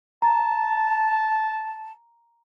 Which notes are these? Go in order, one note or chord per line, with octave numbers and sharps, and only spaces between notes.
A5 A#5